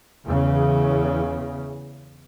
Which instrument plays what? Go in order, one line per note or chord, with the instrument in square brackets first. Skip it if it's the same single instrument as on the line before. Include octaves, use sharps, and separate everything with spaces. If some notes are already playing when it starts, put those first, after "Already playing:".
[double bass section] E2 C#3